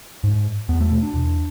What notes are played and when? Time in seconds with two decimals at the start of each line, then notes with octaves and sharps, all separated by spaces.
0.24 G#2
0.69 E2 B3
0.81 A3
0.91 B2
1.03 D4
1.14 E2